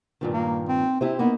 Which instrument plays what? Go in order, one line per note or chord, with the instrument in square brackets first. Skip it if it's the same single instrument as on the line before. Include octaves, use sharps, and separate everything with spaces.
[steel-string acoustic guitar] G2 A#2 D#3
[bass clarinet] A#3
C4
[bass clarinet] C3 [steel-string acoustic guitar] E4 G4 C5
[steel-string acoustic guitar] A#3 D#4 [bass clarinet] B3